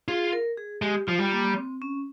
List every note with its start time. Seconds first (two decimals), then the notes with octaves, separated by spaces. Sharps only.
0.08 F4 G#4
0.32 A#4
0.58 G#4
0.82 G#3 G4
1.07 F3 F4
1.19 G3
1.32 A#3
1.56 C4
1.82 C#4